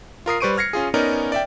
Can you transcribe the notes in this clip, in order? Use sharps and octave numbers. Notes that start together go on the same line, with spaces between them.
F4 A#4 D#6 C7
G3 B4 C5 C#6 D7 D#7
F6 G#6 A#6 C7 C#7
C#4 F4 G#4
B3 C#4 D#4 A#4 D5
D5 E5 G5